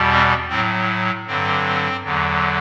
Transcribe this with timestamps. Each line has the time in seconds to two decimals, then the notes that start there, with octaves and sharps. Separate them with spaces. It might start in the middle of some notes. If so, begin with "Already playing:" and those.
Already playing: E2 B2 G3
0.10 C4
0.49 A2 F#3 C4
1.27 G2 D3 F#3 C4
2.03 E2 D3 F#3